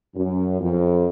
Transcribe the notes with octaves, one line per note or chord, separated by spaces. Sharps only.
F#2
F2